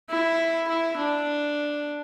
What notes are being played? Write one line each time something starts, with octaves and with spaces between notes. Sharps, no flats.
E4
E4
D4